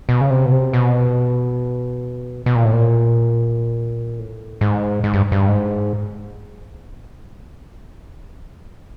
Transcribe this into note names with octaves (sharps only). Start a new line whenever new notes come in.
B2
C#3
C3
B2
C3
B2
B2
A#2
A2
A#2
A2
G#2
G#2
G2
G2
G#2